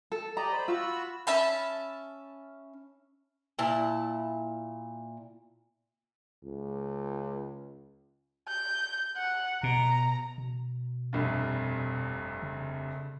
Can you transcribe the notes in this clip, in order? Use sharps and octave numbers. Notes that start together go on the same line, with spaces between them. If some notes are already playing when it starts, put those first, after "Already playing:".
A4
G4 D5 D#5 A#5
C5 B5
F4 F#4 B5 E6
C#4 E5 A5 B5
A#2 E4 A5
C#2
G6
F#5
B2 A#5
B2
F1 C2 G2
C#3